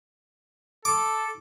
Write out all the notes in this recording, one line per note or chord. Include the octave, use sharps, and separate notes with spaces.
A4 D6